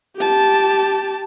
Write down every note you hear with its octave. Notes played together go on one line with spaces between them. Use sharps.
G4 A5